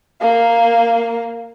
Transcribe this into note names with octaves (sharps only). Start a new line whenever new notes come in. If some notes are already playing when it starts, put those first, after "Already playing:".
A#3 F5